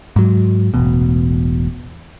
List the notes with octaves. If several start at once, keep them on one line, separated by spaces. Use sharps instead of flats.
G#2 F#3
E1 A1 B2